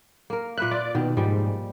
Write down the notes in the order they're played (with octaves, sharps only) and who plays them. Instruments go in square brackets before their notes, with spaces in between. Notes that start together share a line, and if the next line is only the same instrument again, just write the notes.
[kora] A#3 A#4
[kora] A#2 B4 E5 [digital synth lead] F#6
[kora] F4 [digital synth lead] D5
[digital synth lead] B2 [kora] D#3
[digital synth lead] G#2 [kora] F3 G3